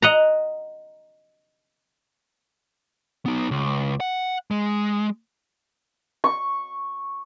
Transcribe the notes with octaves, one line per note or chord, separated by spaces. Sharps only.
D#5 F#5 A#5
B3 D#4
C#2
F#5
G#3
C#6